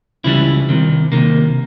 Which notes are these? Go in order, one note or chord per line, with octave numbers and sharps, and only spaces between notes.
C#2 C#3 E3 G3 E4
C2 C3 D#3
C2 C3 D#3 A#3